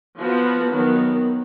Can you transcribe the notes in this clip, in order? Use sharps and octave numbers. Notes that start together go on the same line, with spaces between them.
F3 B3 F#4 B4
D#3 F#3 B3